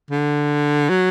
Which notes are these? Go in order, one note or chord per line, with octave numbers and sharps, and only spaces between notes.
D3
F#3